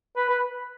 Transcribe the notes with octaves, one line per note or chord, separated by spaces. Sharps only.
B4
B4